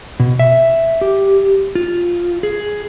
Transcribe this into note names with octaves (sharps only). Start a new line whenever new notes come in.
B2
E5
G4
F4
G#4